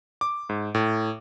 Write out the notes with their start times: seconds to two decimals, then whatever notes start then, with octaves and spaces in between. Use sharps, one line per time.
0.21 D6
0.49 G#2
0.75 A2